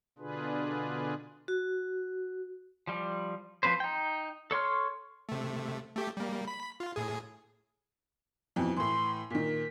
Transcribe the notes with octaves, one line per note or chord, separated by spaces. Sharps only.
B2 D3 D4 F4 G#4 B4
F#4
F3 G3
F3 C4 B4 C5
D#4 G5
A4 C#5 C6 F6
C3 A3
A3 G4
G3 A#3
B5
F4
A2 G#4
F2 B2 E3
A2 E3 C6
A#2 D#3 B6